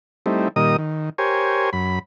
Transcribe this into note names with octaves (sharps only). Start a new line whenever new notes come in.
G3 A3 C4 D#4 E4
A#2 D#3 G3 A#4 D#5 D#6
D#3
G4 A#4 C5 C#5 G#5
F#2 B5